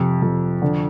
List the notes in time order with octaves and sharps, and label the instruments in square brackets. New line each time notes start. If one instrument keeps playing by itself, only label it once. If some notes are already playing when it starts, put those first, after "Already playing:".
Already playing: [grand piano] F2 C3
F2
D3